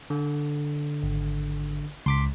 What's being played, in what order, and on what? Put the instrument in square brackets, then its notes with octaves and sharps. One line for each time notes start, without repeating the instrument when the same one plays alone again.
[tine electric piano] D3
[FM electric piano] G#1
[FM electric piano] C#2 [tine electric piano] C6 D6 B6